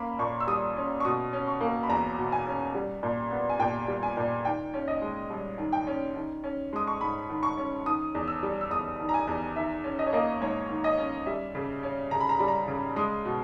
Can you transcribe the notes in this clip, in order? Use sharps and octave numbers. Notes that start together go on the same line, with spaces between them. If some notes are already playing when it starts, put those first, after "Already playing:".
Already playing: A#3 C#4 B5
A#2 C#6
E6
G3 D#6
C#4
C#6
B2 D#6
C#4
C#6
A#3
B5
E2 A#5
B2
G#5
C#4
G3
A#2
B3
G#5
A#2 G5
G3
G#5
A#2
D#3 G5
C#4
D#5
G#3
G2
D#3
G5
C#4
D#3
C#4
G#3 D#6
C#6
G#2 B5
D#3
C#6
C#4
D#3 D#6
E2
E6
G3
E6
E2 D#6
D#3
A#5
G#5
E2
D#3 E5
C#4
D#5
C#5
A#3 D#5
G#2 C#5
D#3
D#5
C#4
G3 E5
C#3
C#4
C#3 A#5
B5
A#5
G3 B5
A#5
C#3
G#3 D#6
B2